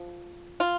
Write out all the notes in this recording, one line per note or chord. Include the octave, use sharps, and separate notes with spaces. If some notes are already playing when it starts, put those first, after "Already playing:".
Already playing: F3
F4